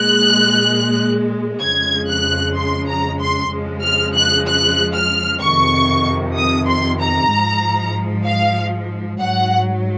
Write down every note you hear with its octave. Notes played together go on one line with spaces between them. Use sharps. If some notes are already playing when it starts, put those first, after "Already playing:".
Already playing: A#2 G#3 F#6
F2 C#3 F3 G#3 G#6
F#6
C6
A#5
C6
F2 C#3 F3 G#3
F6
F#6
F#6
F6
F2 C3 D#3 C#6
D#6
C6
A#5
G#2 F3 G#3
F5
G#2 F#3 F#5